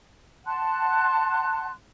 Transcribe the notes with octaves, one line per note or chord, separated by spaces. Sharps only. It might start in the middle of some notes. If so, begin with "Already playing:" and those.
F#5 A5 C6 F#6